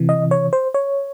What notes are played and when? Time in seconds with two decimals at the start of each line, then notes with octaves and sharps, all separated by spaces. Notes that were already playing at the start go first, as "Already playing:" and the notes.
Already playing: C3 E3
0.09 D#5
0.31 C#5
0.53 C5
0.74 C#5